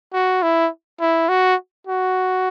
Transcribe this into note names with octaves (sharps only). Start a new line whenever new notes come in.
F#4
E4
E4
F#4
F#4